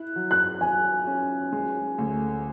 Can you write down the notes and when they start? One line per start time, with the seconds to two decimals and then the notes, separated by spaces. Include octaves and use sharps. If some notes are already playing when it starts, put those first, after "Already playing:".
Already playing: E4 F#6
0.16 F#3
0.31 F#6
0.61 F#3 G#5
1.07 C#4
1.52 G#3
1.98 D2